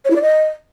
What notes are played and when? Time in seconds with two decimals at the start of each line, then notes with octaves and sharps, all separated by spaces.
0.05 C#5
0.10 E4
0.16 D5
0.22 D#5